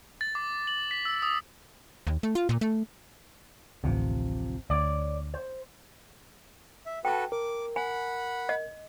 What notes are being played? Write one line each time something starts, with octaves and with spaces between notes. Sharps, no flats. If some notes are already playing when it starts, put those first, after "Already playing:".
A6
D6
F#7
B6
E6
D#6
D#2
A3
F4
A#2
A3
A1 D2 C3 F3
D2 C#5 D5
C5
E5
F#4 A4 B4 G5 A5
A#4 D6
F#5 G#5 B5
D#5